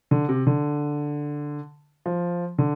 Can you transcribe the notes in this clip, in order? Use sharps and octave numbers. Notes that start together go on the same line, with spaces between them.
D3
C3
D3
F3
D3